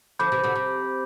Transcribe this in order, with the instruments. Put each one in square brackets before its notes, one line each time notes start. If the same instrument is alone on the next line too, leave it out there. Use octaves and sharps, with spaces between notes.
[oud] D3 F3 [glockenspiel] B5 D6 G6
[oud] C3 E3
B2 D3
C3